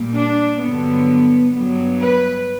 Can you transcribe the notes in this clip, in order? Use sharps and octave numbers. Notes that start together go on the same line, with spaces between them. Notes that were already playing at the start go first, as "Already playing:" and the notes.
Already playing: A#2 G3 A#3
D4
G2 D3 F#3 B3
G2 F#3 B3
B4